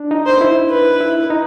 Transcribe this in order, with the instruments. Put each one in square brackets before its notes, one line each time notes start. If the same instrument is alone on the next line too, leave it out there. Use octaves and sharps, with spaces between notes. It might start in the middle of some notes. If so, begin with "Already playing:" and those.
Already playing: [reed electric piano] D4
D#4
[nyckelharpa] C5
[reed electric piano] E4
[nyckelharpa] B4
[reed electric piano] E4
D#4